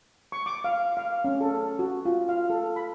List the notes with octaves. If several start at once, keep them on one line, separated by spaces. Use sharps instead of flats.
C#6
D6
F5
F5
C#4
A4
F#4
F4
F5
A4
B5